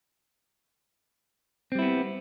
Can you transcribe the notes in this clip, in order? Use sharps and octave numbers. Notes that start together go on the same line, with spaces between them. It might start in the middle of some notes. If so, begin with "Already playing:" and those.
G3 B3 C4 E4